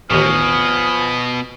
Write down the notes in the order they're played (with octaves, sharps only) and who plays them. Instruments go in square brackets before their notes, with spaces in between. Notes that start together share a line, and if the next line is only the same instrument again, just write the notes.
[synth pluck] A1 D#2 [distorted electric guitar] B2 [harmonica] F3 G#5 F6 [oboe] D#6